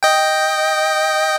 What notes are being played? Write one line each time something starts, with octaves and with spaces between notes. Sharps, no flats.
D#5 G5